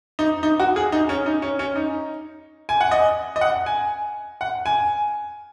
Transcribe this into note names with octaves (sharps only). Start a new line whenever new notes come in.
D#4
D#4
F#4
G#4
D#4
C#4
D#4
C#4
C#4
D#4
G#5
F#5
D#5
D#5
F#5
G#5
F#5
G#5